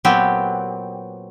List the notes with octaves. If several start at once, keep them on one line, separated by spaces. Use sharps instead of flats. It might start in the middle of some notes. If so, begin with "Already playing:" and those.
A#2 F#3 B3 C4 G4